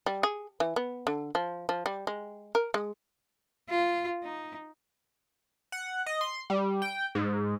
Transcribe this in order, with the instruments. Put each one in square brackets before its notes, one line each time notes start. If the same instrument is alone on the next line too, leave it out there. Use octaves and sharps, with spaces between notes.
[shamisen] G3
G#4
E3
B3
D3
F3
F3
G3
G#3
A#4
G#3
[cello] F4
D#4
[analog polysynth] F#5
D#5
C6
G3
G5
G#2